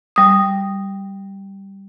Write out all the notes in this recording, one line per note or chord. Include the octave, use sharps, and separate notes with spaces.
G3 D#6